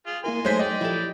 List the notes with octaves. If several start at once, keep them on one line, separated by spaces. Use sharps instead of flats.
F4 G#4
A#3 E4 A#4 G#5 C6
F#3 G#3 A3 D#4 C5 C#5 B6
D5 D#5 G5
F3 E4 G4 A4